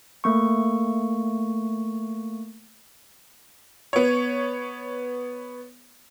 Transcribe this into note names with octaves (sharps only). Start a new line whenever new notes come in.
A3 A#3 C#6
B3 C#5